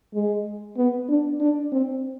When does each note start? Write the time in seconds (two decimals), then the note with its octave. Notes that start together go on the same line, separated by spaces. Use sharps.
0.14 G#3
0.77 B3
1.09 D4
1.40 D4
1.72 C4